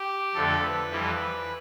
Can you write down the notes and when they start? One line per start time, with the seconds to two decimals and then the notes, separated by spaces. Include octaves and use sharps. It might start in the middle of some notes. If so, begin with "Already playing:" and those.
Already playing: G4
0.34 F2 D3 A3 A4
0.63 B4
0.91 F2 E3 G3